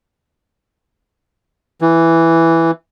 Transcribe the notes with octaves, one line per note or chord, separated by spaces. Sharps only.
E3